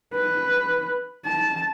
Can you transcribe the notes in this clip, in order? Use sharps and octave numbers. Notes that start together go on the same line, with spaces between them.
B4
A5